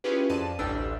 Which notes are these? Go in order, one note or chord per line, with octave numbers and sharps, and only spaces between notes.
C#4 E4 F4 G4 G#4 B4
F2 D5 A5 D#7
A1 D2 G3 D4 A4 E6